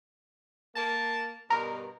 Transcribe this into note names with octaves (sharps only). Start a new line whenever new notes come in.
A#3 A5
G2 B2 A#4